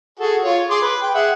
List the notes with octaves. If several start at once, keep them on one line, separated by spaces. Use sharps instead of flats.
F#4 G#4 A4
F4 C#5
G#4 C6 D6
B4
G5
G#4 E5 F#5